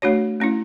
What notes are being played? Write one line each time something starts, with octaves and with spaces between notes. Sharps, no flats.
A3 D4 F#4 C#5
A3 C#4 E4